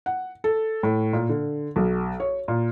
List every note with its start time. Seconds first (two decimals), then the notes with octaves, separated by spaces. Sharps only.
0.06 F#5
0.44 A4
0.83 A2
1.13 A#2
1.29 D3
1.76 B1
2.20 C#5
2.48 A#2